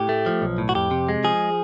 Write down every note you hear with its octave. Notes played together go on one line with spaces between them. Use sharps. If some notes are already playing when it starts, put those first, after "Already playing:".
Already playing: A2 G4
A3
F3
B1
A2
F#4
F2 G4
C3
G#3
F3 G#4